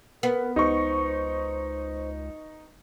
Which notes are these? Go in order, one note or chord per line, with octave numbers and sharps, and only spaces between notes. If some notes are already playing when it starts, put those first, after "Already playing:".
B3 A#4
C#2 D#4 C5 C#6